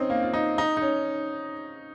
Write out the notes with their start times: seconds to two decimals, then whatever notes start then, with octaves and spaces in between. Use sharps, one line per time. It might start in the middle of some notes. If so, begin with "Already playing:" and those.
Already playing: C4 C#4 D#4
0.10 A#3
0.23 F4
0.34 D#4
0.58 D#4
0.77 D#4
0.82 C#4